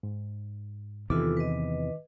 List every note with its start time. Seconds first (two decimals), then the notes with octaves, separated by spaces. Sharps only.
0.03 G#2
1.10 E2 C3 D#3 E3 E4 F4 A4 D6
1.37 B4 D#5